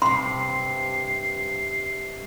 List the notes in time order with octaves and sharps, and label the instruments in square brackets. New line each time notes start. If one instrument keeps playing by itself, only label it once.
[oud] G2 C3 [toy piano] C6 [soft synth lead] C7